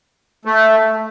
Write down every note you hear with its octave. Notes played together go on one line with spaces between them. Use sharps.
A3